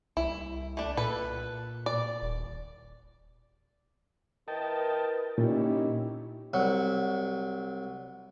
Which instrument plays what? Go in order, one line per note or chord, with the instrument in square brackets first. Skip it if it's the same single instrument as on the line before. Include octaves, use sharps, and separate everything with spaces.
[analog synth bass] C2 [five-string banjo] E4
[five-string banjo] A3 D4
[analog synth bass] A#2 [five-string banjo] A4 B4
[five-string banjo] D5
[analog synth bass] D#1
[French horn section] E4 A#4 B4 [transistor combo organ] D#5 G5 A5
[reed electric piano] A#2 [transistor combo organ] C#4 E4 [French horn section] D#4 G4
[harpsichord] C2 F#3